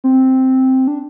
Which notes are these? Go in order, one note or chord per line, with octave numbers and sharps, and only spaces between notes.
C4
D4